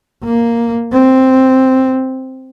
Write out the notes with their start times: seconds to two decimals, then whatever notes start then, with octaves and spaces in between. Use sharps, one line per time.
0.24 A#3
0.92 C4